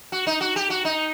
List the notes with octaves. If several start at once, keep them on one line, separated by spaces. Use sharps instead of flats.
F#4
D#4
F#4
G4
F#4
D#4